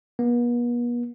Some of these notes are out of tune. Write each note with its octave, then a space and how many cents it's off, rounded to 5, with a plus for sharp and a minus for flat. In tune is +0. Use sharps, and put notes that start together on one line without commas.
B3 -45